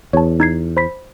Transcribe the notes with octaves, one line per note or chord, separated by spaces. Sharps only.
E2 C#5 A5
D#4 G#6 C7
C5 B5 B6